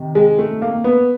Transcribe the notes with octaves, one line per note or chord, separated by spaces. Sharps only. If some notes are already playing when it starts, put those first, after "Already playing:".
Already playing: C3 D#3
G#3
A3
A#3
B3